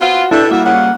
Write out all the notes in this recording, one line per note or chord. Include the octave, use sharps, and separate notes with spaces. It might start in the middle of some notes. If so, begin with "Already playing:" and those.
B3 C4 F4 F#4
B2 D4 E4 G4 A4 E5
A2 G3 A#3 F4 F#4 E5
A#2 C#3 F#5